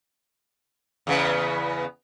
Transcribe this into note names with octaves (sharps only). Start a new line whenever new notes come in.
E2 C#3 B3